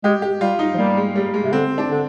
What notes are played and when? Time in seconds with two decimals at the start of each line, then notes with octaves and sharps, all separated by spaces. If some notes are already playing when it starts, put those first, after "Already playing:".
0.04 G#3 G4
0.22 G4
0.41 G3 F4
0.59 D#4
0.74 F3
0.78 G3 A#3
0.97 G#3
1.16 G3
1.34 G#3
1.44 C3
1.53 D3 C4
1.78 D4
1.91 D3